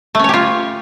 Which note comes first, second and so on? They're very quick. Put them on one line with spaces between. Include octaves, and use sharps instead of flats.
A3 C#4 C#5 G4 F4